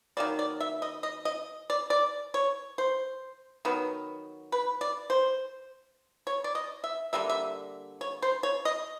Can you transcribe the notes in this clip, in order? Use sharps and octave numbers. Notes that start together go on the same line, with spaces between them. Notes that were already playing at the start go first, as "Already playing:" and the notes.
D#3 F#3 A#3 D5
D5
E5
D#5
D#5
D#5
D5
D5
C#5
C5
D#3 F#3 B3
B4
D5
C5
C#5
D5
D#5
E5
D3 G3 A#3 E5
E5
C#5
C5
C#5
D#5